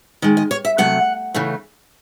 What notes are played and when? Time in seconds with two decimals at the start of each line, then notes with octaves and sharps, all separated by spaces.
0.22 D#3 G#3 D#5
0.37 D#5
0.51 C#5
0.65 E5
0.78 C3 F#3 A3 F#5
1.34 C#3 E3 A3